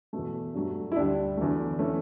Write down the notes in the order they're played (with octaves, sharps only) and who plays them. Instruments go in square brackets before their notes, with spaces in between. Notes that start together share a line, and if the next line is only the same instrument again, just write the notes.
[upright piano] E2 B2 A3
G2 F#3 A3
E4
D2 D3 G3 D4
E2 D3 F#3 A3
E3 A3 C#4